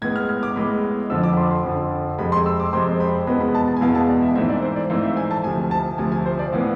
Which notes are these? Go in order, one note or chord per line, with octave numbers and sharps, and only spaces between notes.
A2 G#3 B3 G#6
F6
F6
D6
A2 G#3 B3 B5
F2 D3 F3 E6
D6
B5
C6
C6
F2 D3 F3
F2 C3 G#3 C4 B5
C6
E6
D6
F2 C3 G#3 C4 C6
B5
E2 B2 G#3 B3 B5
B5
A5
A5
G#5
E2 B2 G#3 B3 F5
A5
D5
E5
G#2 E3 A3 C4 E5
D5
C5
D5
G#2 E3 A3 C4 F5
E5
G#5
A5
D2 C3 F3 G#5
A5
D2 C3 F3 G#5
G#5
C5
D5
A2 E3 B3 F5